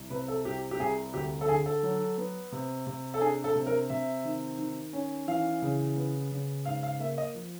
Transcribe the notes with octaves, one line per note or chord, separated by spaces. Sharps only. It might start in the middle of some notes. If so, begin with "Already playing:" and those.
Already playing: C2
C3 B4
A4
C2 G4
G4
C2 G#4
D2 G4
A4
D3 G#4
A4
F#3
B3
C3
C3
A4
D4 G#4
A4
C3
A#4
C3 E5
D#3
D#3
C#4
E3 F5
C#3
B3
C#3
G#2 F5
F5
A#3 E5
D#5
F3